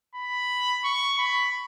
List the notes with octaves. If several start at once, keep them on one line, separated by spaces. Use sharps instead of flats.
B5
C#6
B5